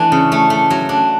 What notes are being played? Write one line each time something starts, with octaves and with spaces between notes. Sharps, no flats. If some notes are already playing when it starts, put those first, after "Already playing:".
Already playing: E3 A3 D4
C#3
A3
A3
F#3
D4